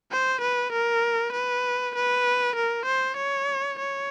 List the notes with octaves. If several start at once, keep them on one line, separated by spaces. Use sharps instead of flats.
C5
B4
A#4
B4
B4
A#4
C5
C#5
C#5